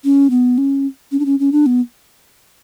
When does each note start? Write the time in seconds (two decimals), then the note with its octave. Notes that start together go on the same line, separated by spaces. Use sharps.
0.04 C#4
0.30 B3
0.58 C#4
1.12 C#4
1.19 D4
1.25 C#4
1.40 C#4
1.52 D4
1.66 B3